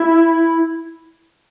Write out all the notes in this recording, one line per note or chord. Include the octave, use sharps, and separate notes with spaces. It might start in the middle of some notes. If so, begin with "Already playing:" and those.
Already playing: E4